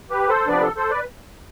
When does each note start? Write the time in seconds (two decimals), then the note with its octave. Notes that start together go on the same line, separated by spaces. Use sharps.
0.10 G4 B4
0.29 A4 C5
0.47 C3 F3 B3 D4 B4 D5
0.62 A4
0.76 A4 C5
0.90 B4 D5